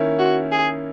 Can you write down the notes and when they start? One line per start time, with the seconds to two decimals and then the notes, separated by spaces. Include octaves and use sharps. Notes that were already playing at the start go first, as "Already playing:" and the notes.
Already playing: D#3 A#3 C#4 E4
0.19 F#4
0.52 G#4